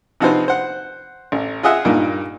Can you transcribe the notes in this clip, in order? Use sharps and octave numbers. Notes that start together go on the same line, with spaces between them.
C3 F3 D#4 F#4 B4 C5
C5 F#5
A1
F4 G#4 D#5 E5 F#5
G2 A#2 A#3 D#4